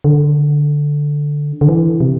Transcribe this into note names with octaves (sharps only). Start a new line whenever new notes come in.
D3
D3
E3
C3